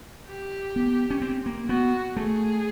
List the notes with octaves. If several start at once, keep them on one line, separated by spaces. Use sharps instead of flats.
G4
B3
C#4
C4
A#3
B3 F#4
A3 G#4